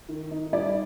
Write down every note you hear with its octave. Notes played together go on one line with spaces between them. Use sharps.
D#3
D#4
G3 D5